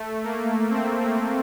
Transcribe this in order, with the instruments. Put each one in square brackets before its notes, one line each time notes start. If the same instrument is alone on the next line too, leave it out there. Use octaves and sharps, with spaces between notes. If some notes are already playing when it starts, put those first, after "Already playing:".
Already playing: [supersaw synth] A3
A#3
C4
A#3